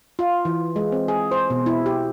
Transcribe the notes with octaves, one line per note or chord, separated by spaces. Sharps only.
F4
E3
G#3
C4
G#4
C5
B2
E4
G4